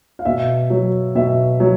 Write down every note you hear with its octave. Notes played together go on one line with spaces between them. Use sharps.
F5
B2 E5
F#3
B2 E5
F#3